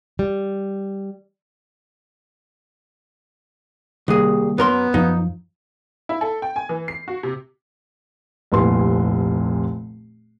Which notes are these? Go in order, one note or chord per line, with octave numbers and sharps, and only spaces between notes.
G3
C2 D#3 G3 A#3 G#4
F#2 B3 A#4 C6
F#2 F3 D#4
E4
A4
G5
G#5
E3
C7
F#4
C3
F1 C2 A#2 B4 C6